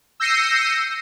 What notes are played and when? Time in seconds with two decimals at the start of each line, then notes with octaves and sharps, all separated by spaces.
0.20 E6 G6 A#6 C7 C#7 D#7